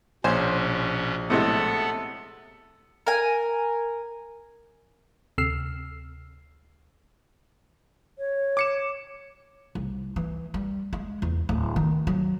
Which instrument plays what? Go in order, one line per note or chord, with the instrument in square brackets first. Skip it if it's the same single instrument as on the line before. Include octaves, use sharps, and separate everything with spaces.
[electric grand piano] A#1 C#5 [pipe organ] B2 C#4 [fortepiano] C5 G#5
[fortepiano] A2 C3 G#3 [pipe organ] B3 F#5 [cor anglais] A4
[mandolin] A#4 G#5
[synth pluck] D2 C3 E6 F6 C7
[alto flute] C#5
[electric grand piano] D6 C#7 E7
[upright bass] C2
E3
G3
G#3
E2
D1
D#3
F#3